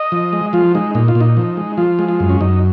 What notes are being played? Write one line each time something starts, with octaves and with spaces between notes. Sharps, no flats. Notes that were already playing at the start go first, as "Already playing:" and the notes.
Already playing: D#5
F3
G#3
F3 F4
G#3 D#4
A#2 D#4
F4
A#2
D#4
F3
G#3
F3 F4
G#3
F4
F#2
C#4
F#2 D#4